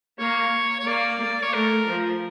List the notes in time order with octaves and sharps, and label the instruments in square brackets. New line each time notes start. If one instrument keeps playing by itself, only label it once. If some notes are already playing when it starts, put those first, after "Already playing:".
[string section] A#3 [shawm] C#5
[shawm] C#5
[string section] A#3 [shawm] D5
[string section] A#3
[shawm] C#5
[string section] A3 [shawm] A#4
[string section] F3